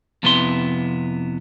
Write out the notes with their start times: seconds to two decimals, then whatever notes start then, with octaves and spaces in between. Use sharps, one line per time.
0.23 F2 C3 B3 E4 C6